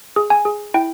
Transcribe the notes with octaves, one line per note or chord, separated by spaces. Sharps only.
G#4
G#5
G#4
E4 G5